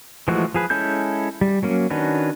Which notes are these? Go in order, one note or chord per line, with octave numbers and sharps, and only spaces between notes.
E3 F3 G#3 A3 F#4
F3 G#4 B4
G#3 C#4 E4 A4 G6
G3
F#3 A#3 C#4
D#3 C#4 D4 F#4 B4